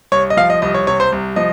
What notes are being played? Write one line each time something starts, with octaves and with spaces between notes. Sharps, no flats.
C2 C#5
D#5
F3 F5
D#5
C2 D#5
C#5
C3 C#5
C5
C2
F3 D#5